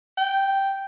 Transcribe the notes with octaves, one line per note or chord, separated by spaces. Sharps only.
G5